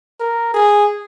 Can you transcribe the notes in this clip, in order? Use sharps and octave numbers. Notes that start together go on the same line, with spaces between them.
A#4
G#4